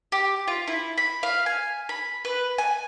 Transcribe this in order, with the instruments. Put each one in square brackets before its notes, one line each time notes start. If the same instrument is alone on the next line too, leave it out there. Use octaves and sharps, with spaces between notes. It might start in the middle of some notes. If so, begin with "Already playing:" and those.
[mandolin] G4
F4
E4
B5
F5
G#5
B5
B4
G#5